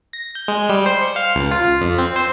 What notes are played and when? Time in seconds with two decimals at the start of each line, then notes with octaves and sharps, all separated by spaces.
0.13 A#6
0.35 G6
0.48 G#3
0.69 G3
0.86 C5
1.02 C#7
1.16 F5
1.35 C#2
1.51 F4
1.81 F2
1.98 C4
2.16 C5